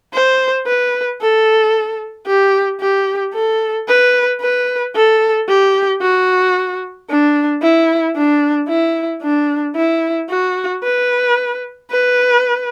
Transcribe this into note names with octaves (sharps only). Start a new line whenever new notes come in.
C5
B4
A4
G4
G4
A4
B4
B4
A4
G4
F#4
D4
E4
D4
E4
D4
E4
F#4
B4
B4